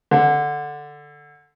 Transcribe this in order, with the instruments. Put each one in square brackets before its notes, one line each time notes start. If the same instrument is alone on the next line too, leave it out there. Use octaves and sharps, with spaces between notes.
[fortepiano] D3